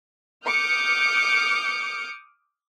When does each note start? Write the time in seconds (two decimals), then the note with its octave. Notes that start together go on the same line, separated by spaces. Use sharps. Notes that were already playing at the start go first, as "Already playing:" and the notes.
0.46 D6 D#6 F6 G6 C#7